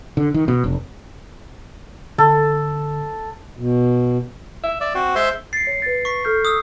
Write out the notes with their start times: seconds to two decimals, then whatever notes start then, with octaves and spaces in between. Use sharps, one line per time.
0.17 D3
0.34 D#3
0.48 B2
0.64 F1
2.18 D3 A4
3.57 B2
4.63 E5
4.81 D5 E5
4.95 C4 F#4
5.15 G#3 C5 E5 C6
5.53 A6 C7 C#7
5.67 C#5
5.82 B4 A6
6.05 C#6 B6
6.25 A4 F6 G6
6.45 D#6 E6